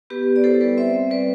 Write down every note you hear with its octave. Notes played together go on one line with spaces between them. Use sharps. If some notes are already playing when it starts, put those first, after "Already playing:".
B3 G4 B4
B3
D5
E4 A4 C5
G3 B4 D5
C4 C5 E5
C4
G3 B4 D5